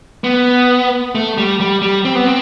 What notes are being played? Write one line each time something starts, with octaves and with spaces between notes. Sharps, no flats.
B3
A3
G3
G3
G3
C4
B3
C4